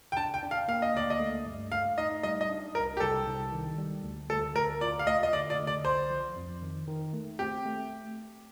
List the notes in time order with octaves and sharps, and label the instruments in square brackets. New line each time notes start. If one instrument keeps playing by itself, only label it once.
[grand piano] G5
[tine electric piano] D4 [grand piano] A5
[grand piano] G5
[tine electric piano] D4
[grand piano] F5
[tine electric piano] A#3 [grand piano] F5
[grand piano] D#5
[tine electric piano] D2 [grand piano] D5
[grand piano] D#5
[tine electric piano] A3
G2
[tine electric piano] A3 [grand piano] F5
[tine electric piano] D#4 [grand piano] D#5
[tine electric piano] G3 [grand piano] D#5
[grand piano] D#5
[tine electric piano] D4
[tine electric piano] C2 [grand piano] A#4
[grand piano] G4
[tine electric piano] C2 [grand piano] A4
[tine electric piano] C2
D#3
G3
D2
[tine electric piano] D2 [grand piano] A4
[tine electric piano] D2 [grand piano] A#4
[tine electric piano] F4 [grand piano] D5
[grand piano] F5
[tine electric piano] A3 [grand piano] D#5
[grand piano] D#5
[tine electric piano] D3 [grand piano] D5
[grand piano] D5
[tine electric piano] D3
[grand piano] D5
[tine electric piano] C2 [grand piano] C5
[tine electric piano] F3
F2
D#3
D#3
A3
[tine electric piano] C4 [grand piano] G4
[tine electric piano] A3